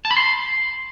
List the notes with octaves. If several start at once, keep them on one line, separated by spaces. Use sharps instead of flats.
A5
B5
C6